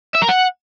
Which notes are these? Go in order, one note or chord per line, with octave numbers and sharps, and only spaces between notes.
E5
A#4
F#5